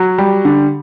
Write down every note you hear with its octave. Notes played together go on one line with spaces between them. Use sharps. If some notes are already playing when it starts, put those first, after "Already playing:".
Already playing: F#3
G3
D3